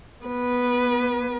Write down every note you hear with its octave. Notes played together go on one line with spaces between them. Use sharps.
B3 B4